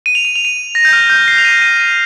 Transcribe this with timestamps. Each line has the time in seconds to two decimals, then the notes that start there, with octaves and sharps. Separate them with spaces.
0.06 D#7
0.15 F7
0.25 D#7
0.35 F7
0.45 D#7
0.75 A#6
0.85 G6
0.93 F6
1.10 G6
1.28 C7
1.38 F7
1.45 D#7
1.62 D#7
1.79 D#7